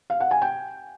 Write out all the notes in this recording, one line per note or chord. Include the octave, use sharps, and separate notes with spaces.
F5
F#5
G#5
G5